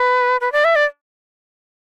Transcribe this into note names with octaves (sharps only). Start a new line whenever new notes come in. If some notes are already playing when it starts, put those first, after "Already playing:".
Already playing: B4
B4
D5
E5
D5